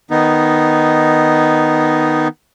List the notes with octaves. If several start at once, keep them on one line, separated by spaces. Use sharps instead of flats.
D#3 B3 D#4